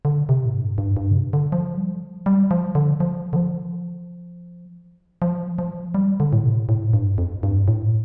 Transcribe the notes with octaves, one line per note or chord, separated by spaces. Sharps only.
D3
C3
A2
G2
G2
G2
D3
C3
D3
F3
G3
F3
G3
F3
D3
F3
D3
F3
F3
F3
G3
D3
A2
C3
A2
G2
F2
G2
A2